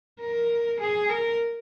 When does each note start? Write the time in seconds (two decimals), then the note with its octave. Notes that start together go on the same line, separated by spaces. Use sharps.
0.20 A#4
0.80 G#4
1.10 A#4